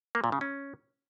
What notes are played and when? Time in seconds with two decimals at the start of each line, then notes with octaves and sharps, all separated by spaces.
0.15 A#3
0.24 A#2
0.32 C#3
0.41 C#4